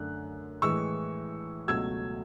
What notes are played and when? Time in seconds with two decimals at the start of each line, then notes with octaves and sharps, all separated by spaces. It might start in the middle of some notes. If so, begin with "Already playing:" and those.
Already playing: F#2 D3 A3 F#6
0.62 A2 E3 G#3 C#6 E6
1.68 C#2 B2 F#3 A3 E6 G#6